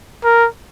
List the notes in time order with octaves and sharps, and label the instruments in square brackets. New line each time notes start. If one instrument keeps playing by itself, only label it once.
[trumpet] A#4